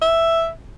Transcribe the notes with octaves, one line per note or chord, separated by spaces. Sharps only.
E5